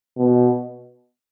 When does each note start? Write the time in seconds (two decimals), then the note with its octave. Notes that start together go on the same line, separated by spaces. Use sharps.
0.17 B2